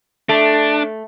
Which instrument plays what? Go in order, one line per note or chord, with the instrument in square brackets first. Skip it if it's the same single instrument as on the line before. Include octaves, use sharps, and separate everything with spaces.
[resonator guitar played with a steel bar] A3 [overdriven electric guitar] D4